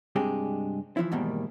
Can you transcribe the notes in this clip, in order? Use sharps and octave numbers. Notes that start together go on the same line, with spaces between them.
G2 C3 G#3 D4 G4 G#4
E3 F3 E4
E2 G#2 B2 D#3 G3 A#3